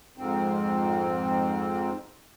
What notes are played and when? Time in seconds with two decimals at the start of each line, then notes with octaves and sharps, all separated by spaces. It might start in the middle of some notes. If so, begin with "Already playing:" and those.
0.18 F2 G#2 C4